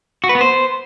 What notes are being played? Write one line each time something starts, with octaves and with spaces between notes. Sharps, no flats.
F#4
B4
B3
C5